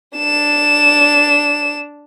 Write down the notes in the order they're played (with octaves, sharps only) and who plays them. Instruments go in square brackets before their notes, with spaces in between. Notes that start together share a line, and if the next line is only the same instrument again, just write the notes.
[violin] D4 E7